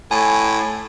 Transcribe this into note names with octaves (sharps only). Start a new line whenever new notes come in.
A2 G#5